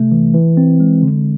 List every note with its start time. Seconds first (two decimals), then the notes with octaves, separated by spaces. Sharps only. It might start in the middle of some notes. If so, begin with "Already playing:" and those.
Already playing: C3 A3
0.12 E3
0.34 E3
0.57 C4
0.80 G#3
1.03 D3